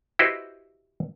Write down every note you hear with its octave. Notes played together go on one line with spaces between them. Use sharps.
E4 F#4 G4 B4 C5 D#5